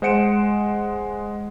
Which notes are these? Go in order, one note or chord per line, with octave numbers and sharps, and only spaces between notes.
G#3 C5 F#5 C#7 D7 E7